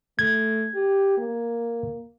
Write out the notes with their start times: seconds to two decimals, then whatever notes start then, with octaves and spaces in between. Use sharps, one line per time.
0.19 A3 G#6
0.75 G4
1.18 A#3